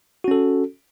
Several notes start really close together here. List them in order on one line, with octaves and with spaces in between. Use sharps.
F#4 C#4 A4